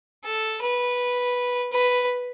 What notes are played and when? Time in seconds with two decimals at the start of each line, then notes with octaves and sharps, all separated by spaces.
0.24 A4
0.62 B4
1.72 B4